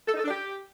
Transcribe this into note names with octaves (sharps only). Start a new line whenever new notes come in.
A4
D#4
A4
D4
G4